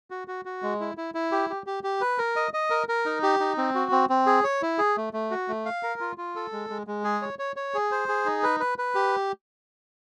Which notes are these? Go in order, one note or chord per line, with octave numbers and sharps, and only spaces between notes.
F#4
F#4
F#4
G#3
E4
E4
E4
G4
G4
G4
G4
B4
A#4
D#5
D#5
A#4
A#4
D#4
G4
D#4
C4
F#4
C4
C4
G#4
C#5
E4
G#4
A3
A3
F#4
A3
F5
A#4
F4
F4
A4
G#3
G#3
G#3
G#4
C#5
C#5
C#5
G#4
C5
G#4
D#4
B4
B4
B4
G4